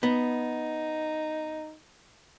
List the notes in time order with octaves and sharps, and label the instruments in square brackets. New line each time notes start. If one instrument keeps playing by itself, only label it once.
[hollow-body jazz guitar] B3 [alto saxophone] D#4